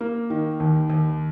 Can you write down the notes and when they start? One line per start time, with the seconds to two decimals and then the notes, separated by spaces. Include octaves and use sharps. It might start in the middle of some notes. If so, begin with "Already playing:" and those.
0.01 A#3
0.30 D#3
0.60 D#2
0.90 D#2